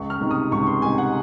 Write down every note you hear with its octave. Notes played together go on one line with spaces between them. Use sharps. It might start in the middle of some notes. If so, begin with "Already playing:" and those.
Already playing: C#2 C#6
F6
C3 D#3
D#6
C#2 C#6
C6
C3 D#3 G#5
F#5